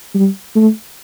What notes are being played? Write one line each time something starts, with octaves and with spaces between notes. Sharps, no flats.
G3
A3